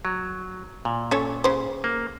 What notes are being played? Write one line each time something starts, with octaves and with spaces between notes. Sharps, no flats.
F#3
A#2
C#4 A4 C#5
C#3 C5
A#3